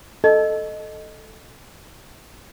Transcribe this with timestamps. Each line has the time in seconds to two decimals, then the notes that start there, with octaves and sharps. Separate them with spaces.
0.24 A4 D#5